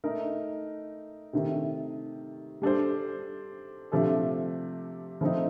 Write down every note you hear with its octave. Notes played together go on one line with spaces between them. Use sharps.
A3 D#4 A#4
C3 D#3 A3
G3 D4 A4 C5
C3 F3 A3 D4 A4
F3 A3 C4 D#4